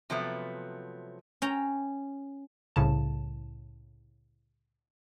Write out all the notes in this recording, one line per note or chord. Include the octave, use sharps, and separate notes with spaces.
C3 F3 F#3 A3 B3
C#4 G5 A#5
C2 A2 C#3 A5